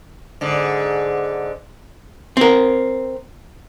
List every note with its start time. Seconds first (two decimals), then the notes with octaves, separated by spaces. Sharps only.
0.41 G#2 D3
2.37 C4 A#4